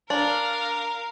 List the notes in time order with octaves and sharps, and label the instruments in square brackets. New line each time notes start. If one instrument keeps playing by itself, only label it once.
[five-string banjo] D4 [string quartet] A#4 F5